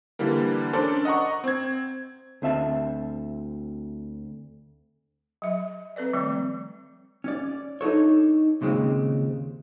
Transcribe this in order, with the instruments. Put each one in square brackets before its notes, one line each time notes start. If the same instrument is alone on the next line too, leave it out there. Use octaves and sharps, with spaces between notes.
[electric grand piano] D3 E3 G3 A#3
C#4 D4 A4 A#4 C5 D5
D#5 F#5 A#5 C#6
C4 G#6
[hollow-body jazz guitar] D2 C4 E5 A5
[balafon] F#3 E5
C4 A4 B4 D5
D#3 F3 G3 A3 C4
[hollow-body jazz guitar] C#4 D5
D4 D#4 F#4 A4 C#5
D#2 A#2 C#3 G#3 C4